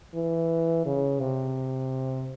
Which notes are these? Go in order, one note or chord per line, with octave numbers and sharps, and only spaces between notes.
E3
C#3
C3